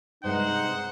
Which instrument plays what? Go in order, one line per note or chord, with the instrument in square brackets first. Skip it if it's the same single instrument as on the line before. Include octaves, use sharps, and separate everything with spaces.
[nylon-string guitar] G2 C3 G#3 [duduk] D#4 [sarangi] C5 [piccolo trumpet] F#5